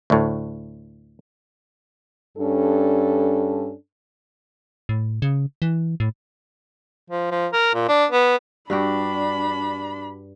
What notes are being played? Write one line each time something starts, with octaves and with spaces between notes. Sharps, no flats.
D2 A2
G2 C#4 D4 A4
A2
C#3
E3
A2
F3
F3
A#4
A#2
D4
B3
G2 D4 F#4 G4 B5